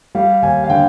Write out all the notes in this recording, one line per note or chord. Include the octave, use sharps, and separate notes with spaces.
G3 F5
D#2 G#5
F5
D3 G5